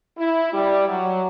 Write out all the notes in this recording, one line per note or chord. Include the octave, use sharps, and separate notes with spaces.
E4
G3
F#3